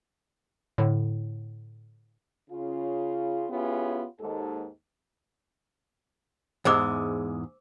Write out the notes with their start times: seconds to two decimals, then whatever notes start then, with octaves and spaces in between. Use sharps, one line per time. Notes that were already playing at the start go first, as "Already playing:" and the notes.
0.78 A2 D3
2.51 C#3 F4
3.50 B3 C#4 E4 F4 G4 G#4
4.20 D#2 G#2 A4
6.65 E2 G#2 G#3 C5 D6 E6